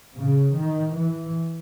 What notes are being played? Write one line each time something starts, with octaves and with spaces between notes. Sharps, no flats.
C#3
D#3
E3